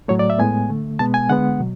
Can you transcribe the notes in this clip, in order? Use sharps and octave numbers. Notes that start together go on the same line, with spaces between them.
A2 F#3 A3 C#5
D5
E5
A2 G#3 B3 G#5
D3 A3
B2 G#3 B3 A5
G#5
D3 G#3 B3 F#5
B2 F#3